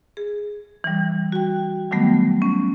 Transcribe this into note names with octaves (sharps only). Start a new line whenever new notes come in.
G#4
E3 G3
F#4 G5
D#3 F#3 G3 A3 B3
C#4